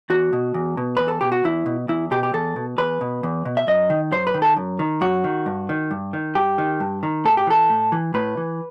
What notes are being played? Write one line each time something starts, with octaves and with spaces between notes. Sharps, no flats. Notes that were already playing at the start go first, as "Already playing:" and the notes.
E2 F#4
B2
E2
B2
E2 B4
A4
B2 G4
F#4
E2 E4
B2
E2 E4
B2 G4
G4
E2 A4
B2
E2 B4
B2
E2
B2
E5
F#2 D#5
D#3
F#2 C5
B4
D#3
A4
F#2
D#3
F#2 F#4
D#3
G2
D#3
G2
D#3
G2 G4
D#3
G2
D#3
A2 A4
G4
E3 A4
A2
E3
A2 B4
E3